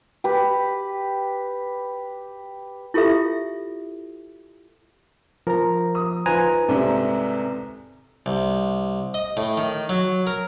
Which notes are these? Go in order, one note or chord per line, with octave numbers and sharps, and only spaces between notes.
G4 B4
E4 F4 G4 A4 E5
F3 A#4 A#5
D#6
D#4 F4 B4 C5 G#5 A#5
C2 G#2 C3 A4 D5
C2
D#5
A2
D#3
F#3
A#4